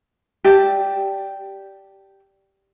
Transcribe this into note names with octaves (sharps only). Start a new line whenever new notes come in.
G4 D5 E5 A5